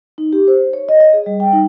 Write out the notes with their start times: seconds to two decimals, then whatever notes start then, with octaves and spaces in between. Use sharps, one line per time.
0.18 D#4
0.33 G4
0.48 C5
0.73 C#5
0.89 D#5
1.00 D#5
1.13 G#4
1.26 G3
1.40 G5
1.53 D#4